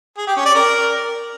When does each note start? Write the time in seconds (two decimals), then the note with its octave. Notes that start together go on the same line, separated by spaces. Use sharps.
0.18 G#4
0.27 G4
0.36 C#4
0.46 D5
0.55 A#4